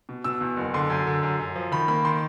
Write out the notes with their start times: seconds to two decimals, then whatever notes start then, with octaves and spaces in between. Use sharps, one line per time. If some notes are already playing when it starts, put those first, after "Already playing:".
0.09 B2
0.24 B2 E6
0.41 E2
0.57 F#1
0.74 D3 C6
0.90 F#2
1.07 D3
1.23 F#2
1.40 F#2
1.56 F3
1.72 D#3 B5
1.88 A#3 B5
2.05 D#3 C6